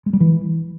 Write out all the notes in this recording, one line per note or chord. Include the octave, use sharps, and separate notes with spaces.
G#3
G3
E3